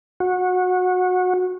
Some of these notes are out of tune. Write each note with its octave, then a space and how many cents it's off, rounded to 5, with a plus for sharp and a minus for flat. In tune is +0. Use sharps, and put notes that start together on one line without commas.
F#4 -20